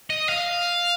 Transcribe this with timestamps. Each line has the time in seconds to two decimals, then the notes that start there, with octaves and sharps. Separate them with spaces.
0.10 D#5
0.29 F5